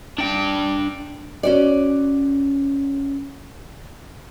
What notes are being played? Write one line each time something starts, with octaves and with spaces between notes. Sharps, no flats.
D4 G5
C#4 F#4 D5